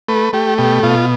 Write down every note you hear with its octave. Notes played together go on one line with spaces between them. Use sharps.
A3 B4
A3 G4
B2 G4
B2 F4